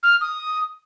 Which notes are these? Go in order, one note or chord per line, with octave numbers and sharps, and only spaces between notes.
F6
D#6